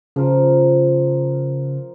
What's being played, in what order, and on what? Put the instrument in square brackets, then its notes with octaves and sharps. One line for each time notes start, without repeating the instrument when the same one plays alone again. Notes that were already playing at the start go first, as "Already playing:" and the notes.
[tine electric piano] C#3 [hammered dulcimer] F3 A#4